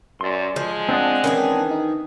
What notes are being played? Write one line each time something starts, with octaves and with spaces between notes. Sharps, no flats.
F#2 D5 C6
F3 G#3
C4 D4 F#5 G5 A5 D#6
D#3 E3 C#4 G#4
D#4